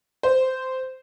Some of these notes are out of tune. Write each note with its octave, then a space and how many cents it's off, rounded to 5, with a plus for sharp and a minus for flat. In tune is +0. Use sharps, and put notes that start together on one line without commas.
C5 -10